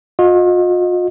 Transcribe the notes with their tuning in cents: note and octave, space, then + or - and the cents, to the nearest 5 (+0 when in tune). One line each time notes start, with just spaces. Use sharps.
F4 +45 D#5 +0